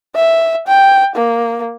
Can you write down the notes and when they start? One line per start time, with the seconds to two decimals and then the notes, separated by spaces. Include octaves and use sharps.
0.16 E5
0.67 G5
1.16 A#3